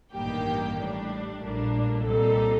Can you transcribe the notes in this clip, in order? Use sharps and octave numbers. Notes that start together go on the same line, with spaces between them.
A1 G2 D#3 G3 A#3 G4
A2 G3 D4
A#1 A2 G3 A#3 D4
C2 A#2 G3 C4 D#4 A4